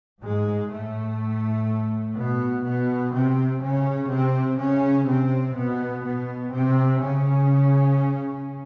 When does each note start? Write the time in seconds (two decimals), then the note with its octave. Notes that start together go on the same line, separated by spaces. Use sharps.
0.23 G#2 G#3
0.72 A2 A3
2.17 B2 B3
2.66 B2 B3
3.14 C3 C4
3.63 C#3 C#4
4.11 C3 C4
4.59 C#3 C#4
5.09 C3 C4
5.57 B2 B3
6.05 B2 B3
6.54 C3 C4
7.03 C#3 C#4